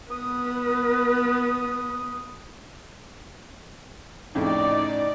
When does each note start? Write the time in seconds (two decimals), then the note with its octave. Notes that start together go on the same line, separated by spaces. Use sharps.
0.11 B3 B4 D#6
4.35 F2 A2 C#3 D#4 D5